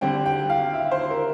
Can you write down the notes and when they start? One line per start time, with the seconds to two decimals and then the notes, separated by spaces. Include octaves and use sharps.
0.01 D3 G3 C4 G5
0.26 G5
0.50 F5
0.73 E5
0.91 C5
1.10 A#4